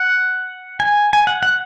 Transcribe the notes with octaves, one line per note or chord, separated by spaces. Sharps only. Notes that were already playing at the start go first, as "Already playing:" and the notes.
Already playing: F#5
G#5
G#5
F#5
F#5